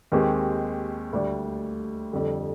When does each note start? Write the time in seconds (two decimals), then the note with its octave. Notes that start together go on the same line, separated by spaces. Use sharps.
0.12 D#2 D#3 G#3 C4 G4
1.13 D2 D3 G3 D4 G4
2.13 F2 D3 G3